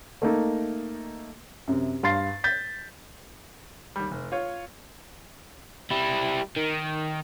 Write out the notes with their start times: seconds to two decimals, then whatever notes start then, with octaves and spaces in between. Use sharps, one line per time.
0.22 A3 A#3 D#4 A4
1.68 F#2 C3
2.03 G2 F5 C6 A6 C7
2.44 G6 A6 B6
3.96 D#2 G3
4.11 F1
4.32 F4 C#5
5.91 G3 E4
6.57 D#3